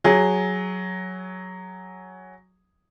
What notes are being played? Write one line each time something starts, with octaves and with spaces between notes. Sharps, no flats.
F#3 G#4